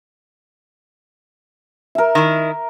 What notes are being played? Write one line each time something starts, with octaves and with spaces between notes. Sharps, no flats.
A#4 E5
D#3 E4